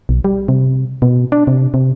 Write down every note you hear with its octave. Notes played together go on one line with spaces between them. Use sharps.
B1
G3
C3
B2
D4
C3
C3